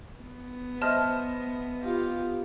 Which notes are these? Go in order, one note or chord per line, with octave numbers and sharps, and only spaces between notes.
B3
C5 D#5 E5 A5 F6
F4 G4